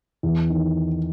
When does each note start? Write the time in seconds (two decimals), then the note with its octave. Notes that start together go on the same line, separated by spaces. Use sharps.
0.23 E2
0.50 D#3